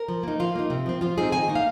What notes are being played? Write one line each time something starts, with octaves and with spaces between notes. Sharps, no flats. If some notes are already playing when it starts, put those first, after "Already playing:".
Already playing: A#4
F3
A#3 D#4
F3 F4
A#3 D#4
C3
F3 C4
F3 F4
C4 D#4 G#4
D#3 G#5
A#3 D#4
F5